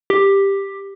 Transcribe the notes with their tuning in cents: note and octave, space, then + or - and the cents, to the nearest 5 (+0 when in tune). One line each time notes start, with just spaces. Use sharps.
G4 +10